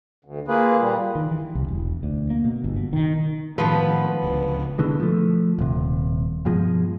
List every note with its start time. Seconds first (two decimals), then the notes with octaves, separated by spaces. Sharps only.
0.25 D2
0.48 A#3 F4 G#4 B4
0.80 A#2 G3
1.15 D#3
1.31 E3
1.55 C2
1.68 E1
2.03 D2
2.30 A#3
2.44 B2
2.64 G1
2.76 B2
2.93 D#3
3.58 A2 D#3 F3 G#3 B3 B4
4.22 D1 C#2 D3
4.78 B2 D3 E3 G#3
5.00 F3 A3
5.59 D#1 C3
6.45 G2 B2 F3 G#3